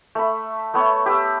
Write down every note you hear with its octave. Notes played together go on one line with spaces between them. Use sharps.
A3 B5
A3 B3 C#5
G4 B4 E5